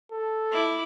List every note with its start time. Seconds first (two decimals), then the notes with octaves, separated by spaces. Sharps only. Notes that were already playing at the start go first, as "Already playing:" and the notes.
0.12 A4
0.52 E4 D6